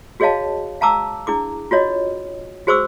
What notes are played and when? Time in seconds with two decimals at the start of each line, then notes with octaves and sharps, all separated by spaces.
0.20 F#4 G#4 C#5 D#5 F5 A5
0.81 F5 A5 A#5 D6 E6
1.27 D4 E4 G#4 D6
1.71 F4 F#4 C#5 D#5
2.67 F#4 G#4 C5 C#6 D6 E6